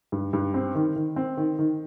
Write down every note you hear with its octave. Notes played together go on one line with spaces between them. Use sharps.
G2
G2
C4
D#3
D#3
C4
D#3
D#3